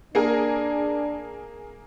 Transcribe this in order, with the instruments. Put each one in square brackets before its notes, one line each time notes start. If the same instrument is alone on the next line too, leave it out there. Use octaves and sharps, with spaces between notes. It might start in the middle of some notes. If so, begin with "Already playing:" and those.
[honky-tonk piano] A#3 G#4 A#4 [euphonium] D4